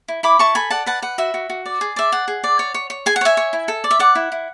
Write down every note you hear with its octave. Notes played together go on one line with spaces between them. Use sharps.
E4
E4 B5 D6
E4 A5 C#6
A4 G#5 B5
D5 F#5 A5
B4 F#5 A5
B4 F#5
F#4 E5
F#4
F#4
D5
G#4
D5 E5
G#4 F#5
G#4
D5
C#5
C#5
C#5
G#4 G#5
F#5
C#5 E5 G#5
C#5
E4
A4
D5
E5
D5 F#5
E4
E4